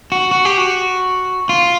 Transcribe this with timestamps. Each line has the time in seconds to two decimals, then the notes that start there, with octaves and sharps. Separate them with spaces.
0.12 F#4
0.31 F#4
0.45 G4
0.58 F#4
1.49 F4